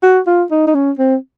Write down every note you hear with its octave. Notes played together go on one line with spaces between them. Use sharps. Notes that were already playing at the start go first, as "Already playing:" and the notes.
F#4
F4
D#4
D#4
C#4
C4